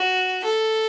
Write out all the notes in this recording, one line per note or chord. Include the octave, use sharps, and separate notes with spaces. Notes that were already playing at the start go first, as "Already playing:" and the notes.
Already playing: F#4
A4